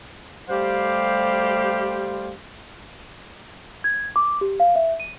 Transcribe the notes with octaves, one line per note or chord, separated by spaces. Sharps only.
G3 A3 G4 C5 F5
G#6
D6
G4
F5
E5
D#7